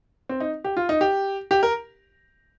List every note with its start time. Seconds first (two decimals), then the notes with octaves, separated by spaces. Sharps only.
0.29 C4
0.40 D#4
0.64 G4
0.77 F4
0.89 D#4
1.01 G4
1.51 G4
1.63 A#4